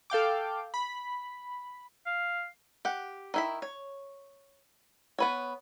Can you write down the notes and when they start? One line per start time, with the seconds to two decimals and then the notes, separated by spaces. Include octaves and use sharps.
0.10 A4 F5 G5 D6
0.74 B5
2.06 F5
2.85 G4 F#5
3.34 D#3 E4 B5
3.62 C#5
5.19 B3 B4 C#5